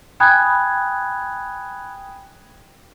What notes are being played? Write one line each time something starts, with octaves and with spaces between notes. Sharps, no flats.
G5 G#5 B5 D#6 F#6 G#6